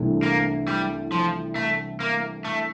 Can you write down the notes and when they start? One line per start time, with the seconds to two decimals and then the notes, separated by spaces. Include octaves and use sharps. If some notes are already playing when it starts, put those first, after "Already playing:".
Already playing: C2 C3 E3 A3 D4
0.23 A#3
0.68 G3
1.12 F3
1.56 A3
2.00 A#3
2.45 A3